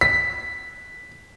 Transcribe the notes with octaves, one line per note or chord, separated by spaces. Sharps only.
B6